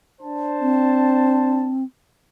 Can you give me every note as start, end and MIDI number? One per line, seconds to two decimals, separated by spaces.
0.22 1.74 62
0.22 1.74 72
0.22 1.74 81
0.61 1.83 60